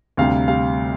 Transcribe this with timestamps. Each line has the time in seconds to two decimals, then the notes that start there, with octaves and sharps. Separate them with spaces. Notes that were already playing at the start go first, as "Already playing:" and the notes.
0.17 D2 C3 G3 F5
0.48 G3 F5